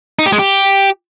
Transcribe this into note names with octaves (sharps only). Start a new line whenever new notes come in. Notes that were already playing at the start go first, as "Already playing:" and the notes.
D#4
G4
G#3
G4